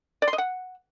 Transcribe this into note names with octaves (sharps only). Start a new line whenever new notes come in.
D5
C6
D#5
F#5